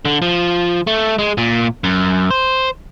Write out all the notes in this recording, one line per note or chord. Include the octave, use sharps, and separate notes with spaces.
D3
F3
A3
G#3
A#2
F#2
C5